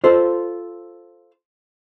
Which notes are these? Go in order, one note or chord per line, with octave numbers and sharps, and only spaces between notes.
F4 A4 C5